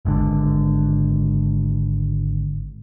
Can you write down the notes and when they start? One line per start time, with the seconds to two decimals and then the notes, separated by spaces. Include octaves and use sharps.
0.05 G#1 G#2 D3